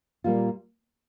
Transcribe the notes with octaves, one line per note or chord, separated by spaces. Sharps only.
A#2 G3 A#3 F4